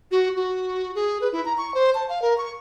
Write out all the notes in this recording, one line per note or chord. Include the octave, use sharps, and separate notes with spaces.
F#4
F#4
G#4
B4
E4
A#5
C#6
C5
A5
F5
A#4
C#6